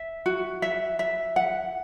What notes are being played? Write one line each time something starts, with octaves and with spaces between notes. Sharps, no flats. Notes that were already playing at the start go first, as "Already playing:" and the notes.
Already playing: E5
F#4
E5
E5
F#5